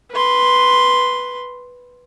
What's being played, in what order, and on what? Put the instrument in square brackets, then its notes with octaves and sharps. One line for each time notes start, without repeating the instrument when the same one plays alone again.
[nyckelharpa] B4 C6